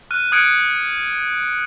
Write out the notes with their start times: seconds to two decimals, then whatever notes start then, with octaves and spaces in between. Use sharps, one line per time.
0.11 F6 F#6 D#7
0.32 D#6 F6 F#6 G#6 C#7 D7